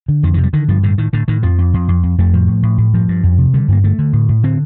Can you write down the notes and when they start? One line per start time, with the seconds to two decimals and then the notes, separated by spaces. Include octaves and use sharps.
0.08 D3
0.23 F2 D#3
0.34 C3 D#3
0.44 G3
0.53 D3 D#3
0.68 G2 F3
0.83 A2 D3
0.98 A2 D#3
1.13 A2 D3
1.28 A2 D#3
1.43 F2 F3
1.58 F2
1.74 F2
1.88 F2
2.03 F2
2.18 F2 A3
2.33 A2 F3
2.48 A2
2.63 A2
2.78 A2
2.94 G2 F3
3.08 G2
3.23 F2
3.38 C3
3.54 D3 G3
3.68 G2 A#3
3.84 D3 A3
3.99 D3
4.13 A2
4.29 A2
4.43 D3 C4